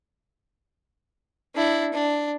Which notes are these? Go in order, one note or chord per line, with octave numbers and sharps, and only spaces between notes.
D4 E4
D4